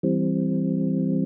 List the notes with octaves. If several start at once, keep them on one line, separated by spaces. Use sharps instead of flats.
E3 G3 C4